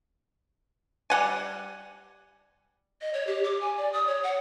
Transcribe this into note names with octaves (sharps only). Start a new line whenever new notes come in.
G3 F#5 G#5
D#5
C#5
G4
D6
G#5
D5
D#6
C#5
F#5